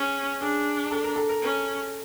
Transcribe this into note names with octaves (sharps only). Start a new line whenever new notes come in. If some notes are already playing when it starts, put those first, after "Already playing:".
Already playing: C#4 G#4
D4 G#4
A4
A#4
A4
A#4
C#4